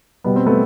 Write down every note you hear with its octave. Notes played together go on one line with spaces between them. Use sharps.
B2 G3 B3
C4
A3 B3